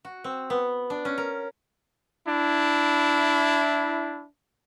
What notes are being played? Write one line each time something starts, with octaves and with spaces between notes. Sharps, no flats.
F#4
C4
B3
D4
C#4
A#4
D4 E4